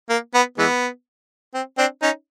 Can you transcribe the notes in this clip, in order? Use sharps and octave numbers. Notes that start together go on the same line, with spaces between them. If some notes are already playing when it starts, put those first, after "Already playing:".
A#3
B3
E3 G#3 B3
C4
C4 D4
C#4 D#4